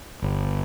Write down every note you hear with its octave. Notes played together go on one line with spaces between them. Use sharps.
G1